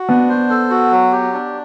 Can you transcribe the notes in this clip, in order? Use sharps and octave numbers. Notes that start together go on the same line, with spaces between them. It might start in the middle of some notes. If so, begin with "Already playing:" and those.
Already playing: F#4
B3 D4
C5
A4
F#4
F#3
G4
D4